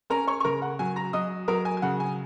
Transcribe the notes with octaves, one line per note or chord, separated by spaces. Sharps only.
C#4 A#4 A#5
C#5 C#6
C#6
C#3 A#4 A#5
F#5
F#3 G#5
A#5 A#6
F#3 D#5 D#6
F#3 A#4 A#5
G#5
G#5
C#3 F#5
G#5